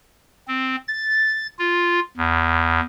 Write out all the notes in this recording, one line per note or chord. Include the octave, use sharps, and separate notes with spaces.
C4
A6
F4
E2